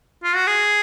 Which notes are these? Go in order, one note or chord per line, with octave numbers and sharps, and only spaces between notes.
F4
F#4
G#4